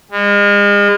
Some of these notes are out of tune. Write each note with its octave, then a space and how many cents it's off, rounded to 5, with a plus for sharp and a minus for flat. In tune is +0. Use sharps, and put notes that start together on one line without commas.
G#3 -40